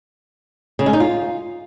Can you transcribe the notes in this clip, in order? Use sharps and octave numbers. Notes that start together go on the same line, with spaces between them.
C#3
G#3
D#4
F4